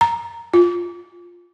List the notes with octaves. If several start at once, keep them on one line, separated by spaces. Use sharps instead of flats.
A#5
F4